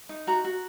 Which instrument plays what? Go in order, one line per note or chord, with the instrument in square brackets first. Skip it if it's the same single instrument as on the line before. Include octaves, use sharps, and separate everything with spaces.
[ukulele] D#4
F#4 A#5
F#4